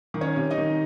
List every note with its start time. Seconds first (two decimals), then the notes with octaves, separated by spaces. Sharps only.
0.14 D#3
0.21 C#4 C#5
0.36 C3
0.51 D#4 D#5
0.58 D#3